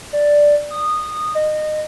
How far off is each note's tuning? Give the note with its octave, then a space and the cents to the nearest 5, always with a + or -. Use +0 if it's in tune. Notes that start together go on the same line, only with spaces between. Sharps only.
D5 +0
D#6 -15
D#5 -20